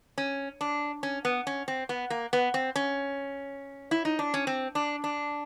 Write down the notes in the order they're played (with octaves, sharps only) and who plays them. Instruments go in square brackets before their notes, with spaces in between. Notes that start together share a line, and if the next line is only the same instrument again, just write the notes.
[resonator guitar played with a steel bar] C#4
D4
C#4
B3
C#4
C4
B3
A#3
B3
C4
C#4
E4
D#4
D4
C#4
C4
D4
D4